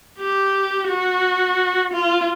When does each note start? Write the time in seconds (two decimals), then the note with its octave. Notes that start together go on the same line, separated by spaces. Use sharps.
0.19 G4
0.88 F#4
1.93 F4